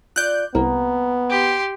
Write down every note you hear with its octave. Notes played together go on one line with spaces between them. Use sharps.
F4 D5 F#6 G6
C2 A#3 B3
G4 C6